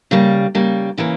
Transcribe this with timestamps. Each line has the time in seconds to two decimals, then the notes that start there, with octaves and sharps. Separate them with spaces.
0.11 C#3 G3 A#3
0.55 C#3 G3 A#3
0.97 C#3 E3 A#3 C#4